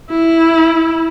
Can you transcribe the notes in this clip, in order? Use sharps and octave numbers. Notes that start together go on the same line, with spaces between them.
E4